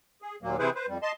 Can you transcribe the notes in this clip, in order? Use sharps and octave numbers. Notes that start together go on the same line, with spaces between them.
G#4
D#2 A#2 F#3 A#3
C3 E3 E4 G#4 B4 C5
B4 C5
F2 G3
D#5 A5 C6